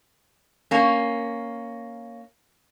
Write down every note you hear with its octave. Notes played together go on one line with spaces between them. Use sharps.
A#3 C#4